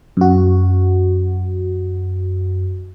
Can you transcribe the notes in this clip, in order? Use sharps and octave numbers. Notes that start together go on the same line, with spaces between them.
F#2 F#4